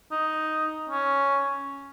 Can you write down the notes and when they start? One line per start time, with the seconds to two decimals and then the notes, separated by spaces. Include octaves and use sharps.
0.12 D#4
0.90 C#4